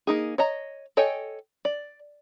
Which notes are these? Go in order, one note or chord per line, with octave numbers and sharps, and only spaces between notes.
A#3 D#4 G#4
C#5 D#5 A#5
A4 C#5 D#5 G5 G#5
D5